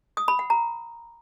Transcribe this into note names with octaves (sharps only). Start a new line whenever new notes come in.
D#6
B5
F#5
A#5